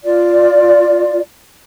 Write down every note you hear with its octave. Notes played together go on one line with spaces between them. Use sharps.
F4 D5